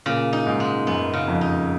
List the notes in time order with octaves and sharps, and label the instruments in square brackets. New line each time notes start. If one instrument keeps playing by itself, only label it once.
[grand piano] A#2 [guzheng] C#3
[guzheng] D#4
[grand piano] G#2
[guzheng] G#3
[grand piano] F#2 [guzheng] B3
[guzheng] C#3
[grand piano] F2
[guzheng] D#4